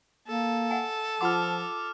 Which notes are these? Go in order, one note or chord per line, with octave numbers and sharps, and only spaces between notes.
A#3 A4
E5 F#5 G#5
F3 F4 F#5 C6 D6 F6